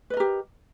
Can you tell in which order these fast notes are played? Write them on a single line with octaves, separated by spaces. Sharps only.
B4 D#5 A#4 G4